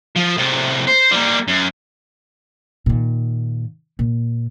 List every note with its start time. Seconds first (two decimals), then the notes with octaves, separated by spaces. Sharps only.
0.16 F3
0.38 A2 C3
0.88 C5
1.11 G3 A#3
1.48 F#2
2.86 A#2 D#3
3.99 A#2